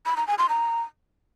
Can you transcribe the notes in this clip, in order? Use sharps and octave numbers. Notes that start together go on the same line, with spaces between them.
B5
A#5
G#5
C6
A#5